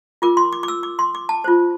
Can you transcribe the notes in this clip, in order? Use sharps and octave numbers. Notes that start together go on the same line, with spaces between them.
F4 A#4 D6
C6
D6
D6
E6
D6
C6
D6
A5
F4 C5